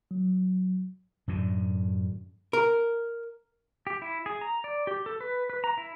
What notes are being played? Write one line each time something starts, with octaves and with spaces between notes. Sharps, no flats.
F#3
F#2 A2 D3
A#4
G4
E4
G#4
A#5
D5
G4
A4
B4
B4
A#5
E4